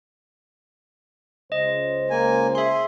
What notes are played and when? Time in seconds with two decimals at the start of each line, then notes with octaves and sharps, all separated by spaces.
1.52 C#2 C5 D#5
2.10 A#3 G#5
2.55 G#4 E5 C6